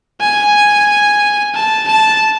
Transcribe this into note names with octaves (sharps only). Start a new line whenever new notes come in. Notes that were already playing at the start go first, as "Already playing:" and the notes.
G#5
A5
A5